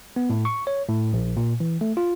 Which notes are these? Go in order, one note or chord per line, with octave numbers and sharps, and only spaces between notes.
B3
A2
C#6
C#5
A2
A#1
A#2
E3
A3
F4